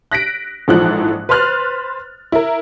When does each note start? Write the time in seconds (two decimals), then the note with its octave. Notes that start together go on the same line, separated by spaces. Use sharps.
0.11 F#6 A#6 B6 D7
0.68 A#1 G#2 E3 F3 A4 F#6
1.29 B4 C5 C6 F6 F#6 A6
2.32 E4 A#4